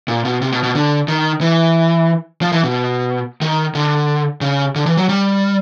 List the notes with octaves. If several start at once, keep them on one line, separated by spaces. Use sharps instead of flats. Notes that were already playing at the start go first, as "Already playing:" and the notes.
A#2
B2
C3
B2
B2
D3
D#3
E3
F3
E3
B2
D#3
D3
C#3
D3
E3
F#3
G3